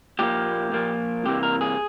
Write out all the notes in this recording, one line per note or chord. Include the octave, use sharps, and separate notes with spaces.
A#2 F3 A#3 G4
A#2 F3 A#3
C2 C3 E3 A#3 G4
A#4
G#4